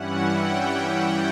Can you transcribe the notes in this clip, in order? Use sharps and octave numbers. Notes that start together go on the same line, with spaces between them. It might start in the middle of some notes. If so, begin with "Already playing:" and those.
Already playing: G2 E3 G3 C#4 E4 F#5
G5
F#5